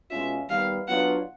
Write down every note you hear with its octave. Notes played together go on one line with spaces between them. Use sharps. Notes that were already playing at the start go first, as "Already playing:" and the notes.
B2 G#3 C#4 F4 E5
D#3 G3 B3 F5
F#3 B3 D4 F4 F#5